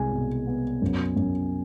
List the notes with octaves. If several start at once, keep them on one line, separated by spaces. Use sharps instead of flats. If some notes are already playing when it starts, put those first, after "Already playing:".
Already playing: C2 G#3 G#5
B2
B3
F#2
F#2